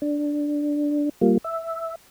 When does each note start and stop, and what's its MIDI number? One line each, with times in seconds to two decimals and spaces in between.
0.02 1.09 62
1.21 1.38 55
1.21 1.38 58
1.21 1.38 65
1.44 1.95 76